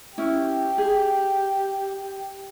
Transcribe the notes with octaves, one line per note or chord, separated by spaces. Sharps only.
C#4 E4 G4
G#4